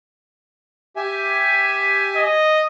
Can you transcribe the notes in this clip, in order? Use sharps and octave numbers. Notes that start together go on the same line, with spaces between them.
G4 E5 G#5
D#5